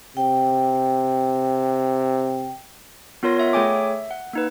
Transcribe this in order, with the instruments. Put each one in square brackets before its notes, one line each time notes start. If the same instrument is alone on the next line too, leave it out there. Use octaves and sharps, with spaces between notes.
[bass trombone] C3 [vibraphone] G5
[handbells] B3 F4 A#4 C#5 C6 A#6
C#5 D#5 E5 F#5
A3 G#4 C#5 G5 G#5 D6
E5
F#5
A#3 D#4 B4